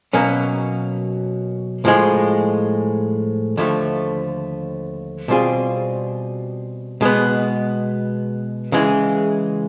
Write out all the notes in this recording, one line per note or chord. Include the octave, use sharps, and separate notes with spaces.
B2 F#3 A#3 C#4
A2 F3 G#3
D#2 D3 F3 A3
B2 G3 C4 F4 G#4
B2 G#3 B3
C#3 E3 G#3